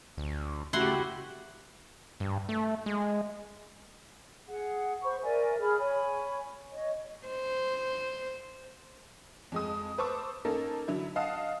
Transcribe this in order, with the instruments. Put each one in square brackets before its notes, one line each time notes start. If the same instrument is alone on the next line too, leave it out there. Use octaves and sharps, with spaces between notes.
[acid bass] D2
[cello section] C#3 F#4 G4 [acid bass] A3 [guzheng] E4 F#5 C6
[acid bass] G2
A3
G#3
[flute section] G#4 F#5
C5 B5 C#6
A#4 D5 E5 G#5
G#4 B5 F6
C#5 G#5 B5
C#5 D#5
[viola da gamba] C5
[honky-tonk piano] F2 G#3 D#6
B4 C5 A5 C#6 D6 E6
A#3 C#4 D#4 A4 A#4
D3 F#3 E4
D#5 F5 F#5 A5 D#6